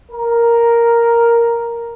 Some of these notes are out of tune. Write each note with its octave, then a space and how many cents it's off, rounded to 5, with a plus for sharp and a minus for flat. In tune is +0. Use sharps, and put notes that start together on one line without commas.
A#4 +0